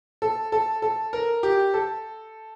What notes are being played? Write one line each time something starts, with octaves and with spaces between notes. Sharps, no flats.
A4
A4
A4
A#4
G4
A4